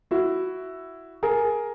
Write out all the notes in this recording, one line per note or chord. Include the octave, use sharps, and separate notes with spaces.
E4 F#4
G#4 A#4